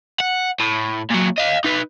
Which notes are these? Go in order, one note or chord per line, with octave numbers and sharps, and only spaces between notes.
F#5
A2
A#2 F#3
D#5 F5
D#4 B4